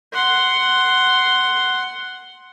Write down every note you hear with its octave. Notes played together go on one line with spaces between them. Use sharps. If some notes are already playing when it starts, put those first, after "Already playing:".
F#5 C6